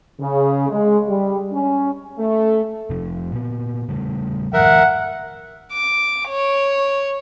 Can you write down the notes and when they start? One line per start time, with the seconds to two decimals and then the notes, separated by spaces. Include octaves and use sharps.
0.20 C#3
0.69 G#3
1.07 G3
1.52 C#4
2.18 A3
2.90 F1 C3 F3
3.32 A#2 B3
3.89 C#3 G3 A3
4.53 G#2 D#3 F3 A#4 E5 F#5
5.73 D6
6.29 C#5